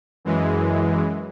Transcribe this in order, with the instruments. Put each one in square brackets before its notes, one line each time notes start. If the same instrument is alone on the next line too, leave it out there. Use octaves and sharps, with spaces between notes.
[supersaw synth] F#2 E3 G#3